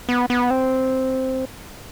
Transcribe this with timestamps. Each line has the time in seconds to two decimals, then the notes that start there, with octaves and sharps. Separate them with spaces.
0.09 B3
0.30 B3
0.51 C4